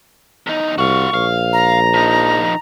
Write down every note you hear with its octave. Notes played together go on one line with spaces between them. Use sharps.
E2 D#4
C2 F#4 F5 C#6
A#1 F5
A#5
F3 D#4